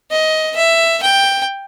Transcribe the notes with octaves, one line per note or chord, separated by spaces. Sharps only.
D#5
E5
G5